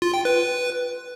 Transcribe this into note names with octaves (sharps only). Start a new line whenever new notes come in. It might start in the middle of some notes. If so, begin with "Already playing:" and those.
F4
G5
B4